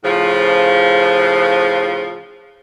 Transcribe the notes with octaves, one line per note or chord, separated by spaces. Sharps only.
A2 C#3 F3